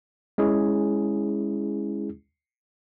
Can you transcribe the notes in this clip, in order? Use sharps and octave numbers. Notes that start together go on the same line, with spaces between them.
G#3 C#4 E4 G#4